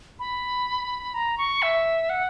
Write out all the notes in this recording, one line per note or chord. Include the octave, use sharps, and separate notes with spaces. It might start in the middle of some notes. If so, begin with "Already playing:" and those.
B5
A#5
C#6
E5
F#5